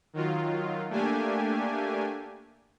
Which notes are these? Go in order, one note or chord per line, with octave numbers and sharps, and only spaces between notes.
D#3 F#3 F4
A3 A#3 D4 G4 G#5